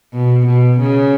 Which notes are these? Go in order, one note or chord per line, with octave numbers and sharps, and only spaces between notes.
B2
B2
C#3